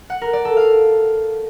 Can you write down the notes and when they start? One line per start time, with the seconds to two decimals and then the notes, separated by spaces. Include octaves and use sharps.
0.10 F#5
0.21 A#4
0.33 D5
0.45 A4
0.57 F5